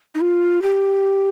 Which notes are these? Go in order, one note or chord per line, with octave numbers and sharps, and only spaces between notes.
D#4
F4
G4